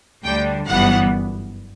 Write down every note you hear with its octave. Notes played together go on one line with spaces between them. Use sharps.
D2 D3 G3 D4 G5
G1 F#2 E3 G3 B3 F#5